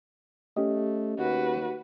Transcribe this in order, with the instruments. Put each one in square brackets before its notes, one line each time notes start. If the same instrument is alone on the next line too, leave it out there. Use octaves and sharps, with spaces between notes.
[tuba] A3 [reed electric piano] C#4 G4 D#5
[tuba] D#2 [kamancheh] F#4 B4